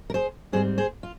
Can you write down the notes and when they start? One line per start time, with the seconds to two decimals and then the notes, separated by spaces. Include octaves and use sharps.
0.10 A#4
0.14 G#4 C5
0.52 G#2 G3 C4 G#4 C5
0.78 G#4 C5
1.03 F4